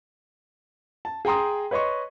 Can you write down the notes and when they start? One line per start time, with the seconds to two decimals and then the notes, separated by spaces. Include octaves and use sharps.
1.05 A5
1.25 G#4 G5 A#5 C6 D#6
1.71 B4 C#5 D#5 C6 C#6